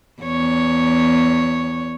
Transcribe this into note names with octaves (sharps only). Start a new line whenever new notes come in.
E2 C#5